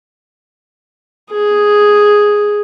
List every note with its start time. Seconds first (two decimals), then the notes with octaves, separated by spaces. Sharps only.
1.30 G#4